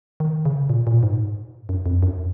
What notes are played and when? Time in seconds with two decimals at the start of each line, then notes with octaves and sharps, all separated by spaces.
0.20 D#3
0.45 C#3
0.69 A#2
0.87 A#2
1.03 G#2
1.69 F#2
1.86 F2
2.03 F#2